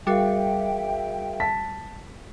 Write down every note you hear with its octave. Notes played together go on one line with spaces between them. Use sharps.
G3 F#4 G#4 A#4 E5 F5 G5
A5 B6